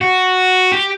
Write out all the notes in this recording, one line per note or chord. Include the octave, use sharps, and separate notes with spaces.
F#4
G4